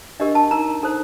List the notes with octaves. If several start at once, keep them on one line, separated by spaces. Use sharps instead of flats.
D4 G4 A#4 D#5
A5
D#4 A#4 A#5
D#4 A4 C5